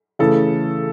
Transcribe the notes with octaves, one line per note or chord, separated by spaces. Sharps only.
C#3 E3 A3 A4